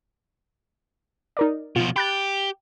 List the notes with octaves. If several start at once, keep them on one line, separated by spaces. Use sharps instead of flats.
D#4 A#4 D5
B2 F3 F4
G4 B5 F#6 A6